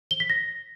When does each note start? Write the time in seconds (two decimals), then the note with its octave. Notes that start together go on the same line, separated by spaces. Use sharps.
0.11 G7
0.20 B6
0.30 A#6